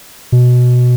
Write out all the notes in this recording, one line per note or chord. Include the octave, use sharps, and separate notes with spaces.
B2